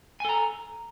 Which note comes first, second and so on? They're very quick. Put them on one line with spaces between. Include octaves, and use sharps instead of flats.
G#5 A4 A#5